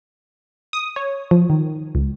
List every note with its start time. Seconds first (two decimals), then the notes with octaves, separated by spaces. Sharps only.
0.73 D#6
0.96 C#5
1.31 F3
1.50 D#3
1.95 C#2